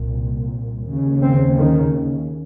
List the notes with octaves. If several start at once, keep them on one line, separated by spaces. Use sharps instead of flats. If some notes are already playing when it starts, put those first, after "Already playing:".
Already playing: C2 A#2
D#2 C#3
C4
D#3